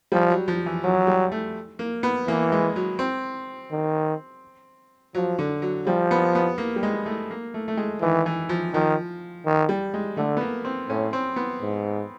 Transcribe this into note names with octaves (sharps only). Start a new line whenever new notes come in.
F3 G3
F#3
F3
E3
F3 F#3
G3
A3
A#3
B3
E3 A#3
G#3
F#3
C4
D#3
F3 F#3
D3
F#3
F3 G3
B3
B3
A#3
G3
G#3
A3
A#3
A3
A3
G#3
D#3 E3
E3
F3
D#3 F3
D#3
G3
G#3
D3 A3
B3
A#3
C4
A2 C#4
C4
B3
G#2